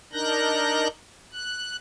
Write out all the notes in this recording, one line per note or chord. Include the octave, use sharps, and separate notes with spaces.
D4 D#4 A#4 F#6 G6 A#6
F#6